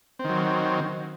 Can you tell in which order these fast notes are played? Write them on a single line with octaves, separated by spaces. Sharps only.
C4 D#3 F#3